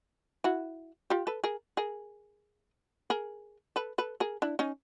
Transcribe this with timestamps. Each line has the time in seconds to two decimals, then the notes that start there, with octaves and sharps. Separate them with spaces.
0.44 E4 F#4
1.10 F4 G4
1.27 A4 B4
1.44 G#4 A#4
1.77 G#4 A#4
3.10 G#4 A#4
3.76 A4 B4
3.98 A4 B4
4.20 G#4 A#4
4.42 D4 E4
4.59 C#4 D#4